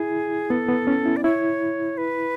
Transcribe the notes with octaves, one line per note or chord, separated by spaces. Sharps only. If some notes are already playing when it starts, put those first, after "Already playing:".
Already playing: E4 G#4
B3 A4
B3
C#4
E4
D5
E4 C#5
B4